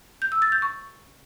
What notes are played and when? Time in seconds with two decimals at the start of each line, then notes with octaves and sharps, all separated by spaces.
0.22 G6
0.32 E6
0.42 A6
0.52 G6
0.62 C#6